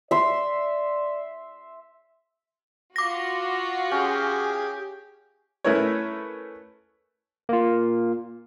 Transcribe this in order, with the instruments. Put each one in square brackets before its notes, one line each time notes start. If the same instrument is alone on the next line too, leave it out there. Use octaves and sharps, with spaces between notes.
[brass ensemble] D5 [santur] E5 C6
[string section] F4 F#4 [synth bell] D6 A#6
[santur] C#4 [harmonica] G4 G#4
[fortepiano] A3 C#4 E4 A#4 B4 C#5
[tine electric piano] A#3 F4